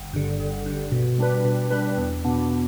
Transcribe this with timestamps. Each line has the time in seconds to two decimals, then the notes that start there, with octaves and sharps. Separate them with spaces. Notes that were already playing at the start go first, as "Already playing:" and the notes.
Already playing: G1
0.13 G2 D3
0.40 G1
0.66 G2 D3
0.92 B2
1.18 G3 D4 B4
1.44 B2
1.71 G3 D4 B4
1.98 E2
2.24 B2 B3 D4